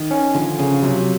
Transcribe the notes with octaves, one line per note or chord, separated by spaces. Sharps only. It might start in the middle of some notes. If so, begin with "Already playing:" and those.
Already playing: D#3
C#4
D3 F3
C#3 C#4
C3 F#3